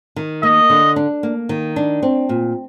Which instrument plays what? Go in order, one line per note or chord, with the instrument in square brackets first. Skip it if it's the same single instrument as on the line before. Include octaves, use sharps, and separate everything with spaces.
[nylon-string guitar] D#3
[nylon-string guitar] A#3 [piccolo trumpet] D#5
[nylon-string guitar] D3
D4
A#3
D#3
D4
C4
A#2